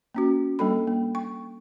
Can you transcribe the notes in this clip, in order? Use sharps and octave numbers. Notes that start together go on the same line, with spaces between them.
A#3 C#4 F#4
G3 A#3 D4 A4 B5
A#3
G5 C#6